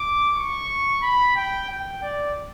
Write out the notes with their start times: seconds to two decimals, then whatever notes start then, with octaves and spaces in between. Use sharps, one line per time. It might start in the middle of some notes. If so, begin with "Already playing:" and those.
Already playing: D6
0.37 C#6
1.02 B5
1.36 G5
1.70 G5
2.03 D5